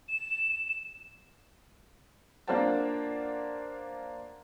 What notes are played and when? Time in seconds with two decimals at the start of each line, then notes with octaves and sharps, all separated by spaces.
0.08 E7
2.47 A#3 D4 F4 C5 F#5 A5